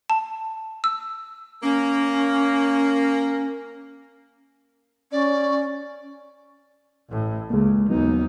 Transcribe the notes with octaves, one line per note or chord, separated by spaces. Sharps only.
A5
E6
A#3 C#4
C#4 D5
A1 A2
C#2 C#3 G#3 A#3
D#2 F#3 B3 D#4